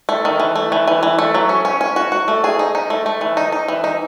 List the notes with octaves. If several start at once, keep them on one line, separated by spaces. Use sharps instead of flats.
A3
D#3
E3
A3
E3
E3
E3
A3
F#3
C#4
C#4
C#4
F#4
F#4
A3
G#4
D#4
D#4
A3
A3
E3
D#4
D#4
E3
D#4